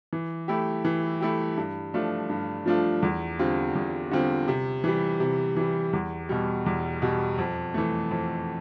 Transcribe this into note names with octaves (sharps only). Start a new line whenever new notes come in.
E3
A3 E4 G4
E3
A3 E4 G4
G2
F3 A3 D4 F4
G2
F3 A3 D4 F4
E2
D3 G3 C4 F4
E2
D3 G3 C4 F4
C3
E3 G3
C3
E3 G3
E2
B2 G3
E2
B2 G3
F2
E3 A3
F2